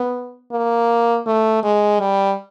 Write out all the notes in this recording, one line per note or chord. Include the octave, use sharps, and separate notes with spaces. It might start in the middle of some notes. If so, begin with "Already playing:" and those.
Already playing: B3
A#3
A3
G#3
G3